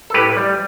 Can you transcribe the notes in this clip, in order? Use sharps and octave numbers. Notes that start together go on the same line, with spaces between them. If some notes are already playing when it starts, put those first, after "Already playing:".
A4
A2 G4 B4
G3